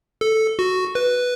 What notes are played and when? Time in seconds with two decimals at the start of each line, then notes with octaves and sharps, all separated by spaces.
0.21 A4
0.59 F#4
0.95 B4